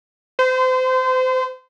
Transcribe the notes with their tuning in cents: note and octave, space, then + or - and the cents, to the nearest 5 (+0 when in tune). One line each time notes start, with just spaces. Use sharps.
C5 -30